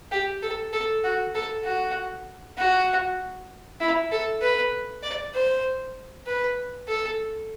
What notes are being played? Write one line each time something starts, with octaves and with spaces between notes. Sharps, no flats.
G4
A4
A4
F#4
A4
F#4
F#4
E4
A4
B4
D5
C5
B4
A4